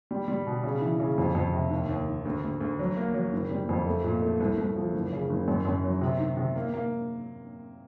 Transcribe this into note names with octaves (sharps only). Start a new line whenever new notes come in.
G3
G3
B2
C#3
E3
C#3
F2
F2
C3
D#2
D#2
D#3
D2
D2
D2
F#3
A#3
F#3
F#1
G3
F2
A3
A#2
A3
C2
C2
F3
F#1
C#3
F#1
F#2
F#2
F#3
C3
D#3
C3
A#3
A#3